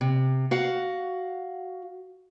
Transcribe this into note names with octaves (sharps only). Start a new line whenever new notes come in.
C3
F#4 F5 F#5